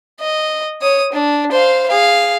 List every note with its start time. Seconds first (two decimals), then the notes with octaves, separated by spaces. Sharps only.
0.20 D#5
0.82 C#5 D#6
1.12 D4
1.52 C5 F5
1.88 G#4 F5